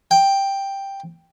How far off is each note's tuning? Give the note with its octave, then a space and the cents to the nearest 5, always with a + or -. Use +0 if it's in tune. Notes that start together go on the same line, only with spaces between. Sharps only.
G5 +5